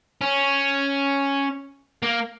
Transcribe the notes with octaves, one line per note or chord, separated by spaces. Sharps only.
C#4
A#3